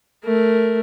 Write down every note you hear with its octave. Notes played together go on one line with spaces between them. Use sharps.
A3 A#4